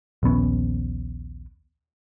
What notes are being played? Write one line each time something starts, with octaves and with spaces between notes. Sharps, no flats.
A#1 D#2 B3 C#4